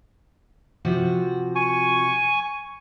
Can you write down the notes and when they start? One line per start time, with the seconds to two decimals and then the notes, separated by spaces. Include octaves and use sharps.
0.85 C3 F3 F#4
1.55 G#5 C#6